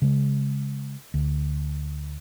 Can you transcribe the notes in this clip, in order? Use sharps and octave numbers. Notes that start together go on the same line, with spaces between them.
C#3 G#3
D2